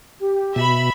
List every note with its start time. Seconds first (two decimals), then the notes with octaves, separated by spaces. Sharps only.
0.19 G4
0.56 B2 E5 B5